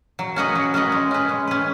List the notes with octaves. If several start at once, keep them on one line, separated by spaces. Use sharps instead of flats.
F#3
C#4 F#4 B4 D#5
F#3
C#4 F#4 B4 D#5
G#3
C#4 B4
G#3
C#4 B4